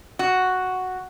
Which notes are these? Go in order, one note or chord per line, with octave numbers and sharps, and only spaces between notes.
F#4